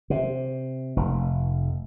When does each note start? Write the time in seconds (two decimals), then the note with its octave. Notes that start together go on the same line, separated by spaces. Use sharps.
0.10 C3
0.96 F1